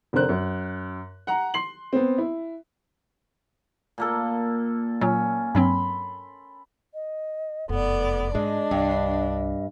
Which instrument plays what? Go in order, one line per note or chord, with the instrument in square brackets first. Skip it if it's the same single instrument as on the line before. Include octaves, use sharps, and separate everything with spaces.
[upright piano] F1 D3 C4 A#4 C5 F#6
F#2
F#5 A#5
C6 C7 F#7
B3 C4
E4
[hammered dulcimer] A#2 A#3 A4
[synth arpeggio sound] A#2 F#3 [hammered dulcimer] C#4
[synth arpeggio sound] G2 F#3 C4 [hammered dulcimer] B5 C6
[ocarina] D#5
[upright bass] F1 F#2 [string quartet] B3 D5 [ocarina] A4
[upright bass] G#2 [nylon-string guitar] G#3 [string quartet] D4 [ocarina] D#5
[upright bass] C2 [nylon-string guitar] G2